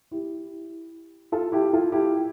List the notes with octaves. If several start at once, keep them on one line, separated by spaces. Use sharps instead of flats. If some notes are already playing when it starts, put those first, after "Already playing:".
E4 G4
F4 A4
E4 G4
F4 A4
E4 G4